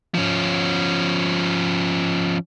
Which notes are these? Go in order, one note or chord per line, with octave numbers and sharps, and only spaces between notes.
F3 C#4